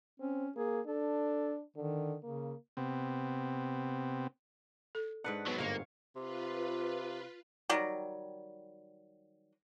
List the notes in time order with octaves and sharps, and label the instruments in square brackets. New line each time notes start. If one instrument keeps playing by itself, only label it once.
[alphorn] C4 [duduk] C#4
[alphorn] A#3 [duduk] G#4
[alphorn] D4 [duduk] A4
[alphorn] D3 [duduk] D#3
[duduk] C#3 [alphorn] A#3
[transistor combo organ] C3 B3 C4
[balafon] A4
[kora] G#2 B4 F#5 [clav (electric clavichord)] D4
[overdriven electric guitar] F#3 B3
[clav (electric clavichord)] G1 G#2 [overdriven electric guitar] A#3 [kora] C#5 F5
[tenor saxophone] C3 [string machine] F4 B4
[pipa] D#3 F#3 G3